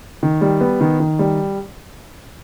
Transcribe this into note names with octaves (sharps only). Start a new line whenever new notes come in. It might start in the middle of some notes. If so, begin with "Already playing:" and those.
D#3
G3
B3
D#3
D#3
G3